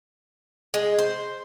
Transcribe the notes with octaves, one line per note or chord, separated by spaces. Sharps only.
G#3
C5